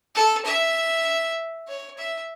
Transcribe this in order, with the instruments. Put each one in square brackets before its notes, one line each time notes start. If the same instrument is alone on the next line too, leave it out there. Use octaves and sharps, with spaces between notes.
[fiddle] A4
E5
C#5
E5